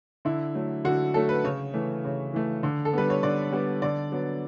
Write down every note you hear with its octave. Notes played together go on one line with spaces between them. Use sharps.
D3 E4
F#3 A3
D3 F#4
F#3 A3 A4
B4
C#3 C#5
E3 A3
C#3
E3 A3
D3
A4
G3 B3 B4
C#5
D3 D5
G3 B3
D3 D5
F#3 B3